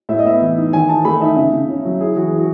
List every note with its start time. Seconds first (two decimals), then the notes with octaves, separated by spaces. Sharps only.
0.09 A2 E5
0.19 D#5
0.25 B3 E5
0.42 E3
0.58 D#4
0.73 D#3 G#5
0.89 D#4 A5
1.05 A3 B5
1.21 D#4 E5
1.36 C#3 E5
1.53 C#3
1.68 C#4
1.85 F#3
2.00 E4 G#4
2.16 E3 F#4
2.27 E3 G#4
2.38 F#4